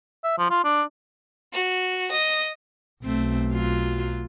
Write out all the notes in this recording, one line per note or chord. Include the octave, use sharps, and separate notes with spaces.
E5
F3
F4
D4
F#4
D#5
B1 A3 C4
F#3 F4